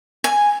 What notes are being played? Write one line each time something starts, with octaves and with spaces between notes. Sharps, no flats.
G#5